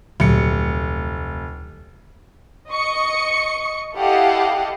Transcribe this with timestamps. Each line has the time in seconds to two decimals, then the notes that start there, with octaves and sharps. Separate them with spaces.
0.20 F1 D2 A#2 F#3 C#7
2.71 D#5 C#6 C#7
3.97 E4 G4 A4 D#5 F5 F#5